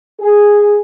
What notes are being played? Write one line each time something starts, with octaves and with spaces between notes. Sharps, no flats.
G#4